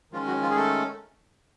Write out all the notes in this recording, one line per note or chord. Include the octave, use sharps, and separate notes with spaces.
D#3 F3 G#3 C#4 F4
F#3 F#4
F3 F4
G#4
A3 A4